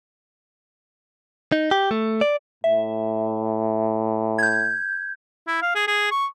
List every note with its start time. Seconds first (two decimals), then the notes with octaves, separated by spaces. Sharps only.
1.52 D#4
1.71 G4
1.91 A3
2.21 D5
2.64 A2 E5
4.38 G6 G#6
5.48 E4
5.62 F5
5.75 G#4
5.88 G#4
6.12 C#6